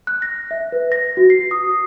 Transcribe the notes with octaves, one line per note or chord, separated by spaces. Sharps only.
F#6
A#6
E5
B4
A#6
F#4
C7
D#6